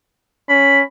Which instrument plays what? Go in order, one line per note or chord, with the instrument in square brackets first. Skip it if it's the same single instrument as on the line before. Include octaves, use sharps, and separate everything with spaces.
[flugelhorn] C#4 [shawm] B5